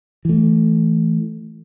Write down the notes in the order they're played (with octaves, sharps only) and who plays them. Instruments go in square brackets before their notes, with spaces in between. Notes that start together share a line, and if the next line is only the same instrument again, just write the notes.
[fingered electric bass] E3 A3